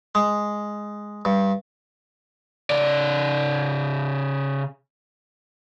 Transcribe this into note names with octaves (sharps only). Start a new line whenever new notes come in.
G#3
G2
C#3 D5